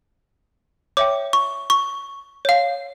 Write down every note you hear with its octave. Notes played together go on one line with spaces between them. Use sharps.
C#5 E5 G5 D6
C#6
C#6
C#5 F5